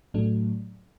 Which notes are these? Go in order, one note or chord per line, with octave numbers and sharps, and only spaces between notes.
A2 F#3 A3 D4